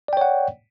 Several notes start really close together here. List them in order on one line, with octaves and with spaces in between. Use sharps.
D5 G5 C#5 F#5